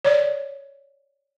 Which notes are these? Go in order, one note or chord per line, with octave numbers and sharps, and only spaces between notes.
C#5 D5